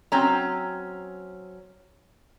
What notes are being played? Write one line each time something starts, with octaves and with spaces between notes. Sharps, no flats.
F#3 C4 C#4 A#5